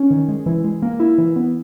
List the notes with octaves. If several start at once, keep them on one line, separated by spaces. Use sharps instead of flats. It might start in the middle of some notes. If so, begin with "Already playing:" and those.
Already playing: C#4
D#3
G#3
E3
G#3
A#3
E4
E3
B3